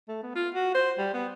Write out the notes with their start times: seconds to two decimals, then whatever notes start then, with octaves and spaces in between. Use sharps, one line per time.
0.08 A3
0.23 B3
0.35 F4
0.55 F#4
0.75 C5
0.98 G3
1.14 B3